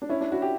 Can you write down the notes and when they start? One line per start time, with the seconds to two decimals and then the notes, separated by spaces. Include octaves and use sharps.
0.02 D4
0.09 C#4 E4
0.21 D4
0.31 E4 F#4
0.42 G4